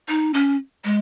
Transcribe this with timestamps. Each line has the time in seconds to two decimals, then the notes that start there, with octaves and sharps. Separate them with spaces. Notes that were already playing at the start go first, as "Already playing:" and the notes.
0.08 D#4
0.34 C#4
0.84 G#3